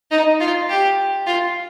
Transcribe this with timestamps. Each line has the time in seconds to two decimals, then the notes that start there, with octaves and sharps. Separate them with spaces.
0.11 D#4
0.40 F4
0.69 G4
1.26 F4